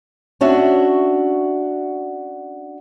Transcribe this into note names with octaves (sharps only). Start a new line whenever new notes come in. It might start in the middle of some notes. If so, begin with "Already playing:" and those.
C#4 D4 F#4 E5